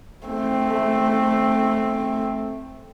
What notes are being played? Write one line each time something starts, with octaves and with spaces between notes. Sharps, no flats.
A3 C4